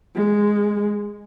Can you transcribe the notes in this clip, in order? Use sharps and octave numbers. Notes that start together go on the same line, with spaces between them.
G#3